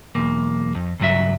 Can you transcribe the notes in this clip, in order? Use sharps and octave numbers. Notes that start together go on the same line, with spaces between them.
B1 E2 A#3
F2
C#2 G2 F#3 E5